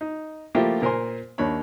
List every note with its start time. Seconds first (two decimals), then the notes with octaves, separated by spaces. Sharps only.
0.01 D#4
0.55 F3 A3 A#3 E4 F4 G4
0.82 A#2 A#4 C5 G#5 C6
1.38 D#2 A#3 D4 C#5 B5